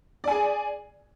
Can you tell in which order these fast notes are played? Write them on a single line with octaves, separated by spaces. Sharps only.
D5 G#5 G#4